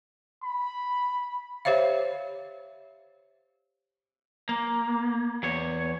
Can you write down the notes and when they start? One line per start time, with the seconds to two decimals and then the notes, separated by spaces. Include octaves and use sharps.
0.44 B5
1.65 G4 C5 C#5 E5 F5
4.49 A#3
5.43 E2 C#5